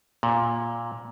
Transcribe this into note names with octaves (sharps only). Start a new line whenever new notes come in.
A#2